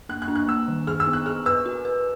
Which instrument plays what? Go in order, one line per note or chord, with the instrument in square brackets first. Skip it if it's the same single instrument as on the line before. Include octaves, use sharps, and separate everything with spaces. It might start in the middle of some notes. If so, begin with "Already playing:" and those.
[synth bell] A#3 [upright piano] F#6
[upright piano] F#6
[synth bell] D4
[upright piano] F#6
[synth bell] A#3 [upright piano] E6
[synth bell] D#3
[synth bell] G#4 [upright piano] F6
[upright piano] E6
[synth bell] B3
[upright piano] F#6
[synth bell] G#4 [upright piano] F6
[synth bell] B4 [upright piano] E6
[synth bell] F#4
B4